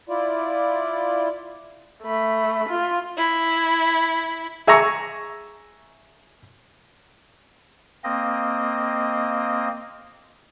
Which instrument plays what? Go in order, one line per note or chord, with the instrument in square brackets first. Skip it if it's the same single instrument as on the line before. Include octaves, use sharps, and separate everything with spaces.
[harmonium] E4 F4 D5
[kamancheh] A3 B5
F4
[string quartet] E4
[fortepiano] G#4 E5 G#5 A#5 C#6
[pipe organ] A#3 C4 D#5